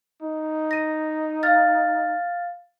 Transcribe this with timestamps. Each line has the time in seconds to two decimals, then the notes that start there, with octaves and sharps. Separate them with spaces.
0.22 D#4
0.71 A#6 D#7
1.43 F5 F6 A6